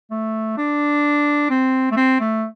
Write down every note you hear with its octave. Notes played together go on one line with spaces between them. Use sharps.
A3
D4
C4
A3
C4
A3